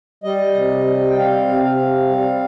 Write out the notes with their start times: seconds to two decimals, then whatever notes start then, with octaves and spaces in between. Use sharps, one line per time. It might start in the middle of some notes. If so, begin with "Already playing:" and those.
0.23 G3 D#5
0.54 C3
0.86 G3
1.10 G5
1.17 C4 F5
1.48 C3
1.63 F5
1.79 C4
2.09 G3